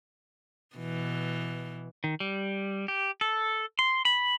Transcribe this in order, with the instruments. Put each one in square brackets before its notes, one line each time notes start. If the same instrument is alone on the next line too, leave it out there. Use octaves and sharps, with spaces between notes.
[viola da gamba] B2 E3
[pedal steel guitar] D#3
G3
G4
A4
C6
B5